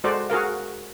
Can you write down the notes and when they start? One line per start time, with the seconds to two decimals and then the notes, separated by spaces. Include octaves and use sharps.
0.04 G#3 F#4 A4 C5 D5
0.30 F#4 G#4 A#4 F5